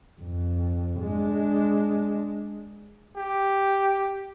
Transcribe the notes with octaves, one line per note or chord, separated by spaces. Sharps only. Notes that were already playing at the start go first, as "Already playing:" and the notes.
F2
G#3 D4
G4